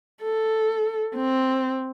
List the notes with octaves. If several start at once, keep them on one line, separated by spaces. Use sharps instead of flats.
A4
C4